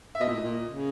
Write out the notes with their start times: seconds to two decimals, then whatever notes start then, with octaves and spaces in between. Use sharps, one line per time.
0.15 E5
0.20 B2 D#5
0.28 A#2
0.35 A2
0.41 A#2
0.68 C#3